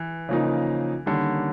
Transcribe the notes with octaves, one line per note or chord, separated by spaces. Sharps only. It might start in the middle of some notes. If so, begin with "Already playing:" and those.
Already playing: E3
C#3 F3 A#3 D#4
D3 D#3 G3 A#3 C#4